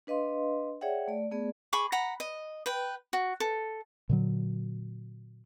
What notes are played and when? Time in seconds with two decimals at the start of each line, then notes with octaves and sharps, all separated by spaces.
0.07 D4 B4 D#5 F5 C6
0.81 G#4 C#5 D5 E5 F#5 G5
1.08 A3 D5
1.31 A3 B3 G#4 D5
1.73 G#4 B5 C#6 D6
1.92 F#5 A#5 B5
2.20 D#5
2.66 B4 G5
3.13 F#4
3.40 A4
4.09 A#2 D3 F#3